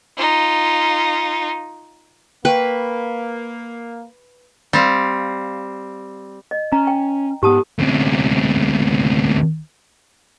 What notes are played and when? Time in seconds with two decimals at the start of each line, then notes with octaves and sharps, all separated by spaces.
0.17 D#4 F4
2.45 A#3 B4 G5 C#6
4.73 G3 C4 F5
6.51 D#5
6.72 C#4 A#5
6.87 G5
7.43 G#2 B3 G4 A5 D#6
7.79 D2 C3